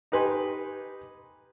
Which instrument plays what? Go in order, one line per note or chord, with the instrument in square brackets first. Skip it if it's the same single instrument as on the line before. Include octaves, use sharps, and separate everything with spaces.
[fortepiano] D#4 G4 B4 G#5 C6